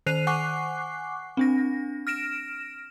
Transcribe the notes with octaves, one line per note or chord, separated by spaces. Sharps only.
D#3 C5 F#6 C7 D#7 F7
F#5 G#5 C#6 D6 F#6 C7
C4 D4 A#6
F6 A#6 D7 E7